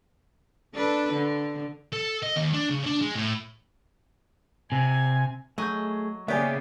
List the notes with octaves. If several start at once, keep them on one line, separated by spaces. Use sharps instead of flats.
D4 A4 B4
D3
A4
D#5
D#2
D4
C#3
D4
G#3
A2
C3 G#5
F#3 A3 G#4 D#5 G6
C#3 A#3 B3 G4 C#5 D5 E5 G#5